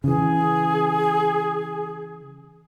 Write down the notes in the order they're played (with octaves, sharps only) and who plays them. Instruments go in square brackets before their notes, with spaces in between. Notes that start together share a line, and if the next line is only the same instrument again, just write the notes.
[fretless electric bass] C#3 E3 [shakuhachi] G#4